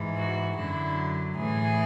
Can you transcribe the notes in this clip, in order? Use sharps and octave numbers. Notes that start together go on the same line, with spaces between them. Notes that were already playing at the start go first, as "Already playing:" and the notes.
Already playing: G#2 E3
F#4
F#2 D3 F#3 E4
A2 E3 G#4